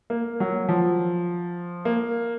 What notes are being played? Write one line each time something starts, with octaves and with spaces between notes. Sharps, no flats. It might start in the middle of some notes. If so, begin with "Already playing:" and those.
A#3
F#3
F3
A#3